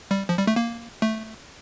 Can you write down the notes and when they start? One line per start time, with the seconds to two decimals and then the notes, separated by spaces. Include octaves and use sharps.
0.11 G3
0.29 F3
0.38 G3
0.47 A3
0.56 A#3
1.02 A3